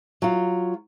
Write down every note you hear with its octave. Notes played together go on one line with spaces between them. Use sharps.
F#3 F4